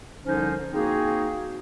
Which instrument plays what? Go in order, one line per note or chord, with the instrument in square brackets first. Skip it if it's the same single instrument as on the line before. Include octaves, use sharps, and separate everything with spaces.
[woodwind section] C2 D3 F3 C#4 D#4 C5
A#3 C4 D#4 F#4 G#4